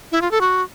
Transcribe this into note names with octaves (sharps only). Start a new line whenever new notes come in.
E4
F4
A4
F#4